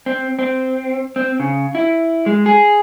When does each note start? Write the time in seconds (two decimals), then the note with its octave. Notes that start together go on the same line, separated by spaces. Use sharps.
0.06 C4
0.39 C4
1.16 C4
1.40 C#3
1.75 E4
2.26 G#3
2.46 G#4